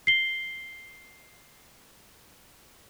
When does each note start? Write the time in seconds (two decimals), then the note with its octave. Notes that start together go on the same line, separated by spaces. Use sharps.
0.07 C7 G7